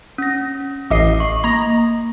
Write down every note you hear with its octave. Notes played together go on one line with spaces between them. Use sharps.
C#4 A#6
A1 D#5 D6 C7
C#6
A#3 A#5